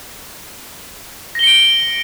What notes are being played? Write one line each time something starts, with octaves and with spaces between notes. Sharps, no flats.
A#6 C#7 D7 G7